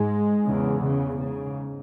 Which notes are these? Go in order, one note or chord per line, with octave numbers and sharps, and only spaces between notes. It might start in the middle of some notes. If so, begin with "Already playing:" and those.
Already playing: G#2 G#3
E2 C#3
C#3
G#2 C#3